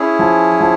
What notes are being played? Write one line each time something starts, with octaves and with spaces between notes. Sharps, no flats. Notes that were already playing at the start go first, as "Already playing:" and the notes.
Already playing: C#4 E4 G#4
F3
F3